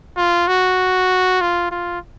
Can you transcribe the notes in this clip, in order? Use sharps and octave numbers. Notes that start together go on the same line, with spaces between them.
F4
F#4
F4
F4